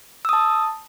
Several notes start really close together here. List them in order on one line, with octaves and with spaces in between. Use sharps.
E6 D#6 A5